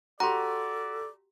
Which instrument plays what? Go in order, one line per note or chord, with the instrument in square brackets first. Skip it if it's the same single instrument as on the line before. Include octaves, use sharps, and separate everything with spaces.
[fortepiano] F#4 G4 [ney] A4 [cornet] D5 [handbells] A#5 C6